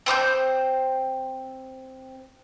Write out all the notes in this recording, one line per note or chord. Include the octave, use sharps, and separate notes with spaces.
C4 C5 D#6 G6